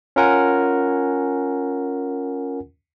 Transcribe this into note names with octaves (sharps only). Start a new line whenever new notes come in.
C#4 F4 A#4 F#5 G#5